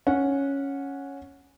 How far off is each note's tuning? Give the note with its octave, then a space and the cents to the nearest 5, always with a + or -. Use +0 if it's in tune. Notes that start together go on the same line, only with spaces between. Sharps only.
C#4 +0 F#5 -15